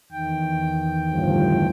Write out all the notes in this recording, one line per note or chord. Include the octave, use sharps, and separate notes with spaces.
E2 D#3 G5
G1 A2 F3